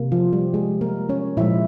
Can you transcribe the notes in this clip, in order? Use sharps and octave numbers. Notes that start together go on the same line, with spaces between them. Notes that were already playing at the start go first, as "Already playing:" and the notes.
Already playing: C3 A#3
F3 F4
G3 G4
G#3 G#4
A#3 A#4
C#4 C#5
A#2 F3 G#3 E4 E5